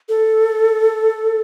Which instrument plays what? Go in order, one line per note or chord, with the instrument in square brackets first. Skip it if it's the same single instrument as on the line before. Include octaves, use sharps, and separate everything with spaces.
[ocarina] A4